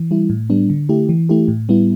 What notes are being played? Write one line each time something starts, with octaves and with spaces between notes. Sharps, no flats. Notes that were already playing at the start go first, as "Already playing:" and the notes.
Already playing: E3
G3 E4
A2
G3 B3 D4
D3
A3 E4 G4
E3
A3 E4 G4
A2
G3 B3 E4